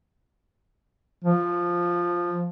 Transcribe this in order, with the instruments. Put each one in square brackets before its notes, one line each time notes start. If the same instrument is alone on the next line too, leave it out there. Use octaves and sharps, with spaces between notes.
[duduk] F3